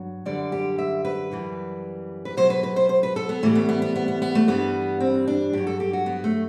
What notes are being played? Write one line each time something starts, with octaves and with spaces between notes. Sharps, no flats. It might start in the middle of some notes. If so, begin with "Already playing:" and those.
Already playing: G2 F#3
F#2 D3 G3 D5
G4
E5
B4
F#2 E3 G3
B4
B2 F#3 C5
B4
B4
C5
C5
B4
A4
B3
A2 E3 G3 A3
B3
B3
B3
B3
B3
B3
A3
G2 E3 G3 B3
C4
D4
G2 F#3 G4
A4
G4
F#4
B3
A3